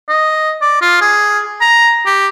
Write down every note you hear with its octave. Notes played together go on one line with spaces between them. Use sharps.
D#5
D5
F4
G#4
A#5
G4